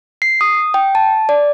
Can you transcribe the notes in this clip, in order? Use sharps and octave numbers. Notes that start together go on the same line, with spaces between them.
C7
D#6
G5
A5
D5